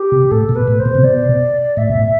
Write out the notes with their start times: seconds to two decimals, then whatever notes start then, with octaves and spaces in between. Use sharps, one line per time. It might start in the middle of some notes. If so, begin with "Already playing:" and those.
Already playing: G4
0.12 C3
0.31 A2 A4
0.49 B2
0.55 B4
0.68 A2
0.79 C5
0.86 B2
0.95 C3
1.03 B2 D5
1.77 A2 E5
1.90 B2
1.95 A2